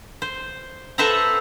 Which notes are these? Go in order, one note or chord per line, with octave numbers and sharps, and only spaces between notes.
C5
A4 B4 C5 E5 F#5 A#5